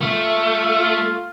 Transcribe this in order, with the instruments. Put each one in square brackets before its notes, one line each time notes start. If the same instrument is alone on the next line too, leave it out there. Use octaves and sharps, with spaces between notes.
[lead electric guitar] A3 [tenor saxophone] F4
[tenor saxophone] F4